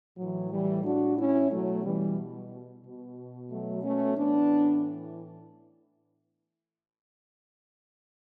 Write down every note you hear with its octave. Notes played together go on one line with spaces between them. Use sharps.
A2 E3 F#3
E3 G3
D4 F#4
C#4 E4
B2 F#3 A3
E3 G3
B2
F#3 A3
A3 C#4
A2 E3 B3 D4